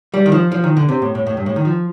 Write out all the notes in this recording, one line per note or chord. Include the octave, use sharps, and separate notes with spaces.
G3
D#3
F3
F3
D#3
D3
C3
A2
A2
A2
G2
A2
D#3
F3